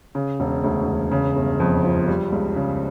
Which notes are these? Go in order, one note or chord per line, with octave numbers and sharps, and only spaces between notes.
C#3
E1
D2
E1
C#3
G1
F2
F3
G3
C#2
C#3